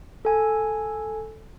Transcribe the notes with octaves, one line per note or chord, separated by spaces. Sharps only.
A4 G#5